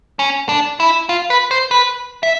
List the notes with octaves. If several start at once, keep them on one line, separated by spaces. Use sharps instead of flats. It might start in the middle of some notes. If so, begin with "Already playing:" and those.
C#4
D4
E4
F4
B4
C5
B4
E5